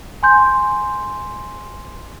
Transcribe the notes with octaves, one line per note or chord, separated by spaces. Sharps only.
G#5 C6 G6